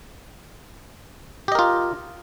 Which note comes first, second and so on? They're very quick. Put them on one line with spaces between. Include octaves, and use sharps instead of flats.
G4 D#5 A#4 F4